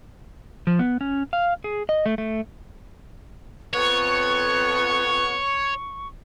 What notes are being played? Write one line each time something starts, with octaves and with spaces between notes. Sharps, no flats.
F3
B3
C#4
F5
G#4
D#5
A3
A3
F2 B3 C#5 C#6